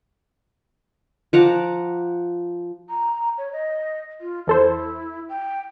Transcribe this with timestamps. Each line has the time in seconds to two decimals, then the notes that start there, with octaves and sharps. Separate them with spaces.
1.33 F3 F#5 A#5 D6
2.89 A#5
3.38 C#5
3.53 D#5
4.21 F4
4.47 E2 E4 A4 C5
5.29 G5